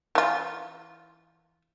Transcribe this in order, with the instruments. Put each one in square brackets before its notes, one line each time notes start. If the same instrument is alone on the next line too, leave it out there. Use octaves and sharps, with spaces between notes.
[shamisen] E3 F4